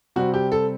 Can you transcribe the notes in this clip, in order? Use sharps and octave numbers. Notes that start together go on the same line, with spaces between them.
C3 G3 C4 F#4
G4
A4